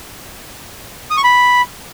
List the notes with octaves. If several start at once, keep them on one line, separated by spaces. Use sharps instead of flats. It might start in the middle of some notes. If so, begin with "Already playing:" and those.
D#6
C#6
B5